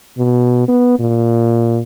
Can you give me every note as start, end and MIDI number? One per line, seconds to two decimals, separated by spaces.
0.18 0.65 47
0.68 0.99 59
0.99 1.81 46